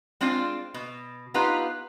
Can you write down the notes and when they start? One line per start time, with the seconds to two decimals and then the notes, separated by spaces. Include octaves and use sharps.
0.21 G#3 C4 D4 F4 D5
0.74 B2
1.34 B3 D#4 F4 G4 B4